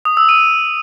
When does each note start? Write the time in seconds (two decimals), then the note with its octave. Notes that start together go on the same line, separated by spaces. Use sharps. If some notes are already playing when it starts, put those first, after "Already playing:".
0.05 D#6
0.17 E6
0.29 D#7